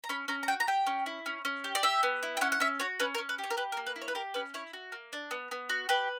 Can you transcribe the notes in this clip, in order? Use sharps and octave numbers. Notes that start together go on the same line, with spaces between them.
A#5
C#4 B5
C#4 A#5
A#5
F#4 G5
A#5
G4 G5
C#4
E4
C#4
C#4
G4
D5
G4 E5
B3
E4
G5
C#4 F#5
F#5
C#4 E5
F#4 C#5
C#4 B4
A#4
C#4
B4
G4
C#5
A#4
G4 B4
A#4
A#3
B4
E4
C#5
B4
G4 A#4
C#4 B4
E4 C#5
F#4
A#3
D4
B3
B3
F#4
G4 B4